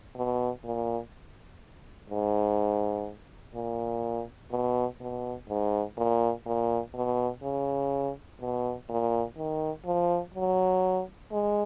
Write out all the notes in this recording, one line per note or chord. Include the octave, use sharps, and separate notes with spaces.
B2
A#2
G#2
A#2
B2
B2
G#2
A#2
A#2
B2
C#3
B2
A#2
D#3
F3
F#3
G#3